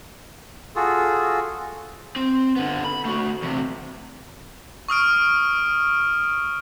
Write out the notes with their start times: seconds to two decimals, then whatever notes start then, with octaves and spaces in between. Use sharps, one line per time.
0.76 F4 F#4 G#4 A4
2.16 C4
2.56 D3 B3
2.84 B5
3.05 A3 F#4
3.42 E2 C3
4.88 C#6 D#6 F6 D7